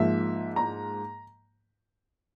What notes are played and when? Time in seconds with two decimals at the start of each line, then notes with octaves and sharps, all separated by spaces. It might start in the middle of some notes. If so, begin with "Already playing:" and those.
Already playing: G#2 F3 A#3 E5
0.56 A#5